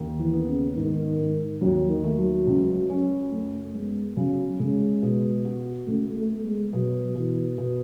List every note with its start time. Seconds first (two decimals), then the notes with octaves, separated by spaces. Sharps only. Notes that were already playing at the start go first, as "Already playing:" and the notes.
Already playing: D#2
0.20 E3
0.33 B3
0.47 C#3
0.76 G#2 D#3
1.18 G#2
1.61 D#2 F#3
1.89 D#3
2.04 A3
2.18 F#3
2.47 C#2
2.89 C#4
3.31 F#2 A3
3.74 G#3 B3
4.17 C#3 F#3
4.60 C#3 G#3
5.02 B2
5.45 F#4
5.87 C#2 A3
6.16 A3
6.30 B3
6.44 G#3
6.72 B2 F#3
7.15 B2 E3
7.58 B2